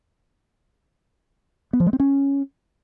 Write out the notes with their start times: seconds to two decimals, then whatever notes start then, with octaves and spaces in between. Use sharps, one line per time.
1.73 B3
1.80 F3
1.86 G#3
1.93 C4
2.00 C#4